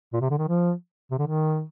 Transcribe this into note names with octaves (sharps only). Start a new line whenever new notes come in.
A#2
C3
D3
D#3
F3
C3
D3
D#3